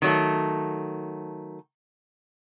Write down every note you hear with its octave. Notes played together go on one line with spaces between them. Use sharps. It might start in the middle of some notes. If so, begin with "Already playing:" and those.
D#3 F#3 A3